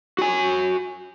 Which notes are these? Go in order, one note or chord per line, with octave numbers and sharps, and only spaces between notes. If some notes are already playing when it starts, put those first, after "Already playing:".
F#4 G#5